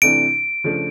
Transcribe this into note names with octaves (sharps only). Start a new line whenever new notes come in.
C3 E3 A3 D4 D7
C#3 F3 A3 D4